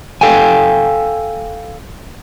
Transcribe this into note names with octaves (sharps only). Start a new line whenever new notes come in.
A4 F5 G5 G#5